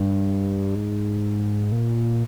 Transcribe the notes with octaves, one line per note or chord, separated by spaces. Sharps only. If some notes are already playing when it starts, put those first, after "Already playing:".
Already playing: G2
G#2
A#2